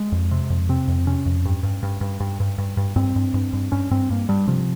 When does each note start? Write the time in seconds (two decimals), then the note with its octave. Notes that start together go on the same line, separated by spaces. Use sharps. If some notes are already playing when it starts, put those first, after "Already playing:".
Already playing: G#3
0.12 F2
0.31 C3
0.50 F2
0.69 C3 C4
0.88 F2
1.07 C3 C#4
1.26 F2
1.45 G2
1.63 G2
1.83 G2
2.01 G2
2.20 G2
2.40 G2
2.58 G2
2.77 G2
2.96 G2 C4
3.16 G2
3.34 G2
3.53 G2
3.72 G2 C#4
3.91 G2 C4
4.10 G2 A#3
4.29 G2 G3
4.47 C3 F3